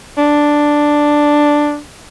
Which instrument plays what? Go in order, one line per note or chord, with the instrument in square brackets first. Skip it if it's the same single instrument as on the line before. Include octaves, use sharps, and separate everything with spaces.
[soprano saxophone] D4